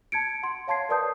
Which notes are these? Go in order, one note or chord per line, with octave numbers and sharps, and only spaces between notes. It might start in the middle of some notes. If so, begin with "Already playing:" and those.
A5 G#6 C#7 D7
F#5 C6
C#5 F5 A5 C6 G#6 C7
A#4 B4 D5 A5 D#6 G6